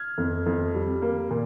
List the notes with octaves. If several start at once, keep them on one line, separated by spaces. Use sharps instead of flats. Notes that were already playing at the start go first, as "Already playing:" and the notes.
Already playing: F6 G#6
F2
F2
G3
A#3
A#2